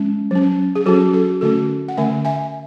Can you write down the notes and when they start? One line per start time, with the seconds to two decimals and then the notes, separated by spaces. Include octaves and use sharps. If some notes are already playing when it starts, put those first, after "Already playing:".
Already playing: G#3 C#4
0.31 F#3 C#4
0.76 G#4
0.86 F#3 C#4 F#4 A4
1.13 F#4 A4
1.41 D3 A3 C#4 F#4 A4
1.88 F#5
1.97 D3 A3 C#4 E5 G#5
2.25 E5 G#5